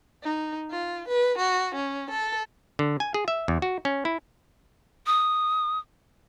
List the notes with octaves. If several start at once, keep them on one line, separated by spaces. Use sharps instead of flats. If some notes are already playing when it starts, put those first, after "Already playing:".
D#4
F4
B4
F#4
C#4
A4
D3
G#5
G#4
E5
E2
F#4
C#4
E4
D#6